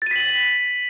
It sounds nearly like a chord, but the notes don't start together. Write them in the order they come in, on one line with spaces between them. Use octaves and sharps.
A6 D#7 B6 F#7